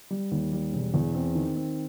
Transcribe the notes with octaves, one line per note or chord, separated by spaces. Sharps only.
G3
D#2
G3
E1
E2
C4
D#3
C4